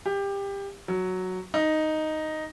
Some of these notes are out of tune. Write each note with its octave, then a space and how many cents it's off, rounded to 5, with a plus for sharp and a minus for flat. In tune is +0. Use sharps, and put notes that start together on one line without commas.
G4 +20
F#3 +0
D#4 +0